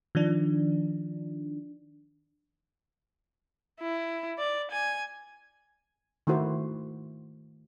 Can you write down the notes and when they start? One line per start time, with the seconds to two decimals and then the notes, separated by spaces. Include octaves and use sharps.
0.15 D#3 F3 D4
3.80 E4
4.39 D5
4.71 G#5
6.27 D#3 A3 E4 F#4 C5